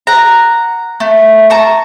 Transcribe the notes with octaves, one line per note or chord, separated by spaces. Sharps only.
F#5 A#5
A3
A5 A#5 C#6